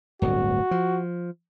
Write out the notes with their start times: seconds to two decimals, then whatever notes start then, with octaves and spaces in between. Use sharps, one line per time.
0.22 D1 G1 D2 F#4
0.71 F3